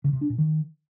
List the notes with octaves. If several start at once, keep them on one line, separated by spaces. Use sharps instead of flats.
C#3
C3
D4
A#2
D#3